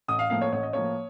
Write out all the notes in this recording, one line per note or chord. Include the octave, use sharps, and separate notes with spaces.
A1 D#6
F5
A2 F3 A#3 F5
C#5
A1 C#5
D#5
A2 F3 A#3 C#5